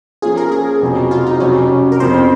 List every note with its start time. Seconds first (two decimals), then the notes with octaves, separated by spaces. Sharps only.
0.22 F3 A#3 C#4 F4 G#4
0.37 A#4
0.52 G#4
0.81 F2 C3 F#3 C4 F#4
1.11 F4
1.27 D#4
1.40 F2 C3 F#3 C#4
1.92 A#4
2.00 F2 C#3 F3 C4 C5